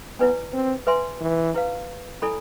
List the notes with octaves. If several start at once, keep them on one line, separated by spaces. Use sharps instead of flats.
B3 E4 B4 D5 G#5
C4
B4 E5 G#5 C6
E3
E4 B4 F5
E4 A4 D5 G#5 B5